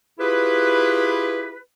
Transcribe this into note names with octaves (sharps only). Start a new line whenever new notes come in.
E4 F4 G4 G#4 B4